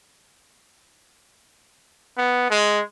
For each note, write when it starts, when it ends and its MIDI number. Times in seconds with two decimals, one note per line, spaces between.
2.17 2.48 59
2.50 2.81 56